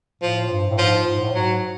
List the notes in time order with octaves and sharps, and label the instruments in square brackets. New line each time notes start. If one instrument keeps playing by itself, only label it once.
[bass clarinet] A2 [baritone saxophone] F3
[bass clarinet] G2
A2
[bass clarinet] G#2 [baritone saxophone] F3
[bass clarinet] G#2
A2
[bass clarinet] G#2 [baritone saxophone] F#3